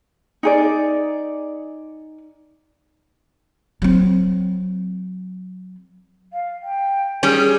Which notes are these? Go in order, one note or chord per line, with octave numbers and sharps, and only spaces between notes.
D#4 G#4 D5
F#3 C4
F5
G5
G3 C#4 G#4